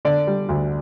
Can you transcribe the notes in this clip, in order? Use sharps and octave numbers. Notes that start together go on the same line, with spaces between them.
D3 D5
G3
D2